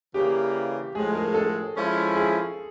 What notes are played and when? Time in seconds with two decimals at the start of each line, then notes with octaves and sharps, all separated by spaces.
0.14 C#3 E3 G3 A#3 G4
0.95 A2 F3 G#3 G#4
1.15 A#4
1.34 A4
1.76 F3 G#3 C#4 E4
2.16 G#4